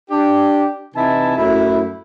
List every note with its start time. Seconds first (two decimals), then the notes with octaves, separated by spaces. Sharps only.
0.10 D4 G4
0.94 C3 E3 D#4 E4 G#5 A5
1.36 F#2 A2 E4